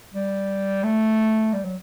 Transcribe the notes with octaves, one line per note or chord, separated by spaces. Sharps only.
G3
A3
G3
F#3